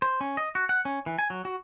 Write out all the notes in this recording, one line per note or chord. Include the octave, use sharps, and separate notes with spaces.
C5
C#4
D#5
F#4
F#5
C#4
E3
G#5
F#3
F#4